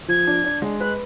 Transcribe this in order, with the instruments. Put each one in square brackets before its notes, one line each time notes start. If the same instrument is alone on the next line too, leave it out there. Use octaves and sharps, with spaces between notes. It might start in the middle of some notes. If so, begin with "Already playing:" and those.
[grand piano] F3 [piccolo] G#6
[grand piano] D4
D4
G#3
[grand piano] B4 [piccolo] F#6